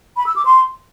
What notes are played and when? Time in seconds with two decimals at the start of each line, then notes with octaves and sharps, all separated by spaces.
0.17 B5
0.26 E6
0.36 D6
0.45 C6